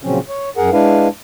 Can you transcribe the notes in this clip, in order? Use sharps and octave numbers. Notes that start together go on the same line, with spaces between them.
A#2 C#3 F3 F#3 C4 C#4
C#5
F#2 G#4 A#4 F#5
G#3 D4 E4 B4 F5